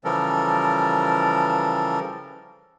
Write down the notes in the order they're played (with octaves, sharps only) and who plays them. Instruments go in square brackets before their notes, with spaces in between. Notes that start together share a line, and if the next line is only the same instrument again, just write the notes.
[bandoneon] C#3 E3 F3 G3 A4 A#4